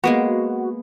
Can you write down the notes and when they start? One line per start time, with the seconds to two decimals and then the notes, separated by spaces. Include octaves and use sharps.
0.04 G#3 A#3 B3 F#4